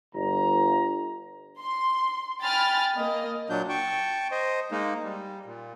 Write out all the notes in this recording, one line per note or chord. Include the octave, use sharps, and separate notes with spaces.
G1 A#5
C6
G5 G#5 B5 F6 A6
A#3 D#5
A#2 F#3 D4 G6
G5 A5 C#6
C5 D#5
G#3 A#3 D#4
G3
A#2